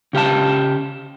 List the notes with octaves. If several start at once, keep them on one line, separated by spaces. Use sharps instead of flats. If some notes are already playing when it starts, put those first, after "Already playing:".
C#3 G4 F5 A5